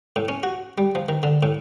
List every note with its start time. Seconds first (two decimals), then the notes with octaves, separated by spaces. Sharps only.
0.16 A2
0.28 C#4
0.43 F#4
0.78 G3
0.95 F3
1.09 D#3
1.23 D3
1.43 A2